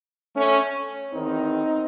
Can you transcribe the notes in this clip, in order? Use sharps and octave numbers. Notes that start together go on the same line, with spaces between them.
A3 C#4
E2 D#3 C4 D#4